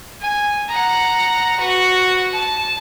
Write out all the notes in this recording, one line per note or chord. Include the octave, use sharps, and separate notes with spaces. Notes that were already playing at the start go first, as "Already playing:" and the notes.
G#5
F#5 A#5
F#4 B4
A5